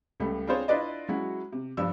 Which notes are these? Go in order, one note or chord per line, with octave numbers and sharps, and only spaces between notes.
C#2 G3 A3
C4 D4 F4 G#4 C5 C#5
D4 E4 F4 B4 D5 D#5
F#3 G#3 C#4 E4 F#4
C3
G2 F3 D4 E6